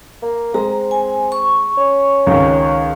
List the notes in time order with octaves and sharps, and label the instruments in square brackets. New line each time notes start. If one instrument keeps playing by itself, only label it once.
[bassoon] A#3
[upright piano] G#3 [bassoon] C4 [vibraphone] A#5
[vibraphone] G#5
C#6
[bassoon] C#4
[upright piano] C#2 D#3